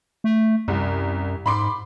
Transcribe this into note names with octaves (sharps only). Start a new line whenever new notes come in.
A3
C2 F#2
G#2 B5 C6 D6